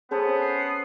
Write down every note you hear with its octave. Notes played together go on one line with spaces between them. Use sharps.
B3 C#4 G#4 A4 C5
C7